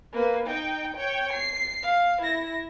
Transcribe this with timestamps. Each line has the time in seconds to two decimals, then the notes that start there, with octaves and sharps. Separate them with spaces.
0.13 A#3 B4
0.46 D#4 G5
0.96 C#5 G5
1.32 C7
1.83 F5
2.21 E4 A#6